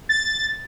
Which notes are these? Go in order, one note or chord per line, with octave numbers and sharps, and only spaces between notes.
A6